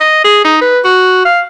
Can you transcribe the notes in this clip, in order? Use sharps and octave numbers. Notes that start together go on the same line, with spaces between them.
D#5
G#4
D#4
B4
F#4
F5